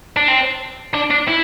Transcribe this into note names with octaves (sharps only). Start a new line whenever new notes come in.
D4
C4
D4
D4
E4